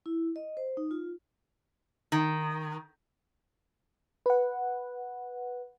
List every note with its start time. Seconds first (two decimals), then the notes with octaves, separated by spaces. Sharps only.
0.06 E4
0.36 D#5
0.57 C5
0.77 D#4
0.91 F4
2.12 D#3
4.26 B4 F#5